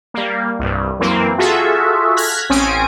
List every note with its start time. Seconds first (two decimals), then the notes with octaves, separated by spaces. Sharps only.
0.14 G3 A#3
0.59 C2 G2
0.99 F#2 E3 A#3 C4
1.38 F4 F#4 G#4 A4 E5
2.17 F6 F#6 G#6 A#6 B6
2.49 A1 C4 C#4 G#5 D#6 D7